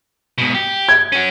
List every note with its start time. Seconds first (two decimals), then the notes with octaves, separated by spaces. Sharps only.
0.38 G#2 B2
0.55 G4
0.89 G#6
1.12 C#4 F#4